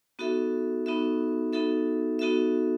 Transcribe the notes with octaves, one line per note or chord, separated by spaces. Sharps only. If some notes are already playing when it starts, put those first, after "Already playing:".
B3 D#4 F#4 A4 E5
B3 D#4 F#4 A4 E5
B3 D#4 F#4 A4 E5
B3 D#4 F#4 A4 E5